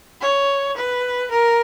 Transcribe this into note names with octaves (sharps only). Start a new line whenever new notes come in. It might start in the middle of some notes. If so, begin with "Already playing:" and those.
C#5
B4
A#4